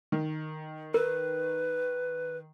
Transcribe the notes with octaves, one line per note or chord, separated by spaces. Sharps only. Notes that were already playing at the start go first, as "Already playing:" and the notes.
D#3
A#4 B4